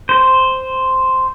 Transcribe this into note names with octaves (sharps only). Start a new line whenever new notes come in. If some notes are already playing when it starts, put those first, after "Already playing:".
C5